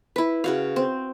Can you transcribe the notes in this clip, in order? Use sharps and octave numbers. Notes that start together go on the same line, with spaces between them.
E4 B4
C#3 F#4 F5
C4